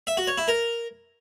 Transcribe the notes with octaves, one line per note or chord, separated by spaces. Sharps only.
E5
F#4
C#5
E4
A#4